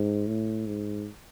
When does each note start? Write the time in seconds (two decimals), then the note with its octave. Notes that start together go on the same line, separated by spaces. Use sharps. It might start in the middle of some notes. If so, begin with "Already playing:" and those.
Already playing: G#2
0.27 A2
0.67 G#2